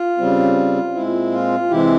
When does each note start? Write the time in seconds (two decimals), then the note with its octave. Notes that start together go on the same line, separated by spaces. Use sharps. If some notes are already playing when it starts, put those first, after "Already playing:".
Already playing: F4
0.18 C#3 G3 C4
0.95 A#2 G#3 C4 E4
1.32 F4
1.70 C3 E3 G#3 C4 E4 G4